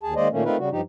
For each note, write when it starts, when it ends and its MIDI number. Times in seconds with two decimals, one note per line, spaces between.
0.03 0.14 39
0.03 0.14 68
0.03 0.14 81
0.16 0.28 51
0.16 0.28 56
0.16 0.28 58
0.16 0.28 72
0.16 0.28 74
0.16 0.28 75
0.32 0.44 46
0.32 0.44 51
0.32 0.44 57
0.32 0.44 58
0.32 0.44 61
0.45 0.57 57
0.45 0.57 60
0.45 0.57 63
0.45 0.57 65
0.45 0.57 70
0.45 0.57 71
0.58 0.69 49
0.58 0.69 55
0.58 0.69 66
0.71 0.81 43
0.71 0.81 53
0.71 0.81 63
0.71 0.81 67